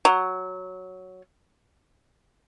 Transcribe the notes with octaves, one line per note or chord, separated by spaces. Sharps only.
F#3